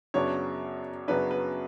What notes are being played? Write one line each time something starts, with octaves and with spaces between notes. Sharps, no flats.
F#2 C#3 F#3 B3 D4 C#5
F#2 C#3 F#3 B3 D4 B4
B4